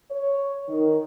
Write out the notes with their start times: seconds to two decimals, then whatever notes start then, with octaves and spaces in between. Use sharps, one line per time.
0.11 C#5
0.68 D#3